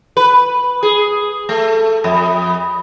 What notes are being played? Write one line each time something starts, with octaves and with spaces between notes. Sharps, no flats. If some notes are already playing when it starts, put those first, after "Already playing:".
B4
G#4
A3
F2